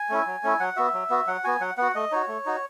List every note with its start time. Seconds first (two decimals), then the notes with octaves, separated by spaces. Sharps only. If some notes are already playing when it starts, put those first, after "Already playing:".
Already playing: G#5
0.09 A3 C#4 E4
0.26 F#3
0.43 A3 C#4 E4
0.60 F#3 F#5
0.76 B3 F#4 E5
0.94 F#3
1.10 B3 F#4
1.27 F#3 F#5
1.44 B3 F#4 G#5
1.61 F#3 F#5
1.77 B3 F#4 F#5
1.95 A3 D#5
2.12 D#4 F#4 C#5
2.28 A3
2.46 D#4 F#4